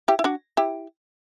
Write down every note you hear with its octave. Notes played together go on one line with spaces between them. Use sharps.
E4 G4
E4
D4 F#4
E4 G4